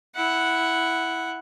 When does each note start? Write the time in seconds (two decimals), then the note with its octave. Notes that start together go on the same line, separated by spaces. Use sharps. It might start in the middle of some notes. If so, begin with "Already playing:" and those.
0.16 E4 F#5